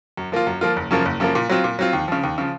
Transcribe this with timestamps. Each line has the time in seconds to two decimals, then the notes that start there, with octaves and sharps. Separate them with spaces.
0.17 F#2
0.32 F3 A#3 F4
0.47 F#2
0.61 F3 A#3 F4
0.76 F#1
0.91 F#2 C#3 F3 A#3
1.05 F#1
1.20 F#2 C#3 F3 A#3
1.35 A#2
1.49 F#3 C4 F4
1.64 A#2
1.79 F#3 C4 F4
1.93 D#2
2.08 C#3 F3
2.23 D#2
2.38 C#3 F3